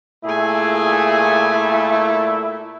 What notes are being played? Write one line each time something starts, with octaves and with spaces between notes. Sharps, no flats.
A#2 A3 E4 G#4 G#5